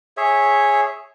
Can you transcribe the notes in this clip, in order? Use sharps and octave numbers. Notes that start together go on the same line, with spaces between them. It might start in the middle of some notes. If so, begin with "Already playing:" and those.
G#4 C#5 E5